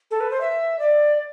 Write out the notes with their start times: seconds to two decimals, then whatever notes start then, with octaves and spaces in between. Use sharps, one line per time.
0.11 A4
0.20 B4
0.31 C5
0.41 E5
0.79 D5